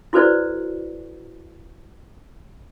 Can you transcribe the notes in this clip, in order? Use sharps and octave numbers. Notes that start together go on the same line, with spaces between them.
E4 F#4 A4 B4 C5 D5